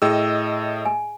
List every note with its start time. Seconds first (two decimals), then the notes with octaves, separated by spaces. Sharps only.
0.02 A2 G#4 D#5 G5 E6
0.85 G#5